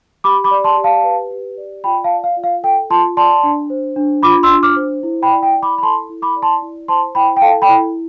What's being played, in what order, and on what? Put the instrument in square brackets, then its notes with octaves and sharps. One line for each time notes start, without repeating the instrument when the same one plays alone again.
[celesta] G4 B5 D6
B5 D6
D5
A5 C6
G4
F5 A5
B4
G4
D5
F4 G5 B5
F5 A5
D5
F5
F4
F5
A4 G5
F4 A5 C6
D5 A5 C6
D4
C5
D4
F4 B5 D6
C6 E6
D4
D6 F6
C5
E4
G5 B5
D5
G5
E4
B5 D6
B5
A4 A5 C6
E4
B5 D6
D5
A5 C6
E4
C5 A5 C6
E4 G5 B5
G5
A4 F5 A5
G5 B5
E4